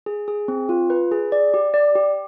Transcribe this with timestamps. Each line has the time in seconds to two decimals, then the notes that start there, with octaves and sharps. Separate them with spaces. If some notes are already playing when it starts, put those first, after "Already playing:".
0.06 G#4
0.28 G#4
0.48 C4
0.69 F4
0.90 B4
1.12 G#4
1.32 D5
1.54 G4
1.74 D5
1.95 G4